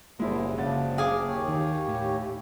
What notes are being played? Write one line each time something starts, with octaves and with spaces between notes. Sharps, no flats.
F#1 A#2 D3 G3 G#3 A#3 E4 C5
C#3 F3 D4 F#5 A6
G#4 F5 G#5 D6
D#2 G4 C#5
D#3
A2